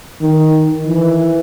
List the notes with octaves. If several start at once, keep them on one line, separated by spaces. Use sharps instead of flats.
D#3
E3